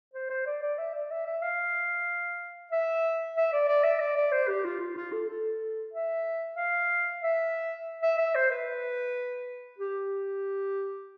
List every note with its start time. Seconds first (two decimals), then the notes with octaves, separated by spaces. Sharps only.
0.14 C5
0.30 C5
0.46 D5
0.62 D5
0.78 E5
0.95 D5
1.11 E5
1.26 E5
1.42 F5
2.72 E5
3.36 E5
3.52 D5
3.68 D5
3.84 E5
4.00 D5
4.16 D5
4.32 C5
4.48 G4
4.65 F4
4.80 F4
4.96 F4
5.12 A4
5.28 A4
5.93 E5
6.57 F5
7.22 E5
8.03 E5
8.18 E5
8.35 C5
8.51 B4
9.79 G4